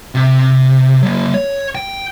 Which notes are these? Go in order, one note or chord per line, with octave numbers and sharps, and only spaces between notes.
C3
F#3 A#3
C#5
G5